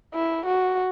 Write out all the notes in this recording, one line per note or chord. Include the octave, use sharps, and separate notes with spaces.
E4
F#4